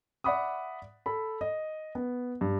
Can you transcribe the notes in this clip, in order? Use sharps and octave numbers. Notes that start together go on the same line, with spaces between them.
D5 E5 F#5 B5 D6 D#6
A4 B5
D#5
B3
G2